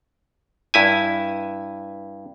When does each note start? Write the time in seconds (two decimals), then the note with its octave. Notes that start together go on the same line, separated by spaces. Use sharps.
0.74 G2 E4 G#5